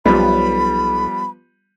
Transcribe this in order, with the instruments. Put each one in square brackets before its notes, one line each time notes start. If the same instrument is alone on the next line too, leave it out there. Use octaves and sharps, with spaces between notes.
[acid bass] B1 [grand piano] F3 G3 B3 [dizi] B5